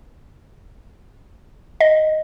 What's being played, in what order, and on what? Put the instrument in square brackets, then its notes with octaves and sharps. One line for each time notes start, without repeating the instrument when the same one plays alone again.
[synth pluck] D#5